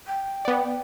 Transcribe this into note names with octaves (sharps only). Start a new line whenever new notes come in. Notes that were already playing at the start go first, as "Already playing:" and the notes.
G5
B3 D5